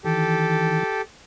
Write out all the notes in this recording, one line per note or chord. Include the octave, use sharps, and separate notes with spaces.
D#3 E3 G4 A4